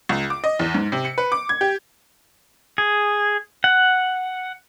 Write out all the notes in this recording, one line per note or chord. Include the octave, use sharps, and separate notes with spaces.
C#2
D6
D#5
E2
G#2
C3
C#7
B4
D6
G#6
G4
G#4
F#5